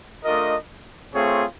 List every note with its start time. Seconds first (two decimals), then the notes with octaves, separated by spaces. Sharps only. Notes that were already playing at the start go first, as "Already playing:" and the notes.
0.24 A3 D4 F4 A#4 D#5
1.14 A3 C4 F4 G#4 C#5